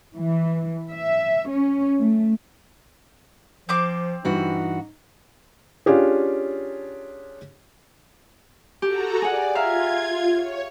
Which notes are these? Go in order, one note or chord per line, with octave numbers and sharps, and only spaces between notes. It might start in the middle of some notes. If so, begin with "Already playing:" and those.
E3
E5
C#4
A3
F3 C4 C6 D6
G2 E3 D#4 F#4
C#4 D4 F4 G4 G#4
F#4 G4 A4 A#5
G#4 D5 F#5
F4 E5 F5 A#5 G#6
C#5